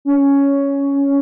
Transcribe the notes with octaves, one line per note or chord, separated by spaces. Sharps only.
C#4